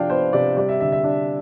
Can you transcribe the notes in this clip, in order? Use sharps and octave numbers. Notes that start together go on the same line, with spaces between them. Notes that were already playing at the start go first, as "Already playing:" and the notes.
Already playing: C3 F3 D4 F5 G5
B3 C5
C3 D5
G3 D5
E5
D3 E5
E5
D4